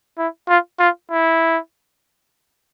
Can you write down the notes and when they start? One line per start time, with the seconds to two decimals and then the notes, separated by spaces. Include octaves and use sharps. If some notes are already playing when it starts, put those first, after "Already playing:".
0.18 E4
0.48 F4
0.80 F4
1.11 E4